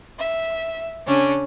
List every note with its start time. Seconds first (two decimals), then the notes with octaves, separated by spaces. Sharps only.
0.17 E5
1.06 C#3 C#4 D4